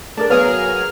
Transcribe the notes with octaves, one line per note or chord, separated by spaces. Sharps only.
A3 D4 G#4 A#4 D5
F#3 B3 G#4 A#4 B4 C#5 F5 F6